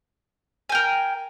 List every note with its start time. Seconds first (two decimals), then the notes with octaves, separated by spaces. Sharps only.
0.69 G#5
0.72 G5
0.75 A#4